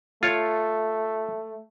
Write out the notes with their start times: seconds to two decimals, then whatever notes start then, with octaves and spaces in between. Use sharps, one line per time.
0.23 A3 F4 C#5